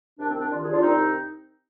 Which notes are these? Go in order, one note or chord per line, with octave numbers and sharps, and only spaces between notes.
C2 C3 D#3 D4
C4
D4
C2 C3 D#3 D4 F4
F4 G#4
D4 F4
C2 C3 D#3 C4 D#4